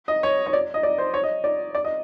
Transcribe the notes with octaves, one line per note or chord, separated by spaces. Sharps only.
D#5
C#5
C#5
D5
D#5
D5
C5
C#5
D#5
D5
D5
D#5